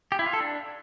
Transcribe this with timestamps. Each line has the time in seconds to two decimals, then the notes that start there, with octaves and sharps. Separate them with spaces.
0.12 G4
0.19 E4
0.26 F4
0.33 A4
0.41 D4